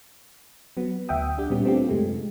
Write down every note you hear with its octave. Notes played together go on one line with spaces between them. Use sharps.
F#3 B3
D2 E5 F#5 G5 D#6
D4 G4
A#2 G3 B3 C#4 G4
A3 B3 C4 D4 F4 G4
F#2 C3 G#3 A3